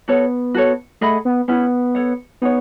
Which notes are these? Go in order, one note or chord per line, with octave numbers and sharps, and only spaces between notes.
B3 F#4 A4 C#5
F#4 A4 C#5
A3 G#4 D#5 F#5 B5
B3
B3 C#4 E4 G#4
A4 C#5 F#5
B3 D#4 G#4 C#5